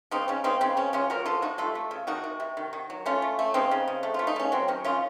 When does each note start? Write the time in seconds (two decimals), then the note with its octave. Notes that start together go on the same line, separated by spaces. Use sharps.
0.11 C#3 C4 D#4
0.28 C#3 C#4
0.44 C#3 C4 D#4
0.61 C#3 C4
0.77 C#3 C#4
0.93 C#3 C#4 F4
1.10 F3 F#4 A#4
1.26 F3 F4 A4
1.42 C3 D#4 F#4
1.58 A3 F4 A4
1.75 A3
1.91 C#3
2.07 D#3 D#4 F#4
2.24 C3
2.40 C3
2.57 D#3
2.73 D#3
2.90 F#3
3.06 A3 C#4 F4
3.22 A3
3.39 A3
3.54 C#3 C4 D#4
3.71 C#3
3.88 C#3
4.03 A3
4.14 A3 F4
4.27 D#4
4.36 C#3 C#4
4.52 F#3 C4
4.68 D#3 C#4
4.85 D#3 C#4 F4